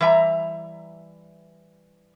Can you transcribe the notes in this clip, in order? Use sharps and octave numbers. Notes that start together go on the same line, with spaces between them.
E3 G3 E5 G5 A#5